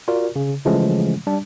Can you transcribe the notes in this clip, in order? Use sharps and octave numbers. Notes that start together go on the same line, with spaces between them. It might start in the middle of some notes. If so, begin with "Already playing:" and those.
F4 F#4 A#4 D5
C#3
C#3 E3 F3 G#3 A3 C#4
G3 D4